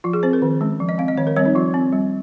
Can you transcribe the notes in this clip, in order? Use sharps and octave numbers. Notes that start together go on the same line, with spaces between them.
F3 F4
G#4
C4 C5
A#4
D#3
G#3 C#4
F3
D#5
C4 F5
D#5
D#3 C#5
A#4
G3 C4 C#5
D#4
F3 F4
C4
G3